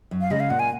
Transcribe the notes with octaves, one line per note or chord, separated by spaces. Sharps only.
F#2
F5
C#3 G#3 C#4 D#5
F5
A#2 F#5
G#5